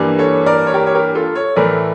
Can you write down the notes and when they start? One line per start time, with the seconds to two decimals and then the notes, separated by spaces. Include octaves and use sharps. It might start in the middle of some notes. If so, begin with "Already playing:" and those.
Already playing: G2 E3 G3 A#3
0.19 A4 C#5
0.46 A#4 D5
0.67 C#5
0.74 G4 A#4
0.86 C#5
0.95 G4 A#4
1.15 F4 A4
1.35 A4 C#5
1.56 A2 E3 A3 A#4 D5